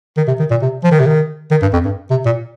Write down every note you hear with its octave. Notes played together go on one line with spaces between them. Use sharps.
D#3
C3
D#3
A#2
C3
F3
D#3
C3
D#3
D#3
G2
F2
G2
C3
A#2